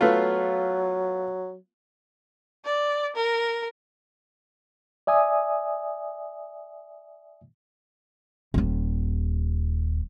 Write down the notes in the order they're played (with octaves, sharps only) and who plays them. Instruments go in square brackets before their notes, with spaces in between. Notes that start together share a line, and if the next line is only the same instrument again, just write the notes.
[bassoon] F#3 [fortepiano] A3 B3 F4
[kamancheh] D5
A#4
[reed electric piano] D5 E5 G#5 D#6
[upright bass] D#1 D#2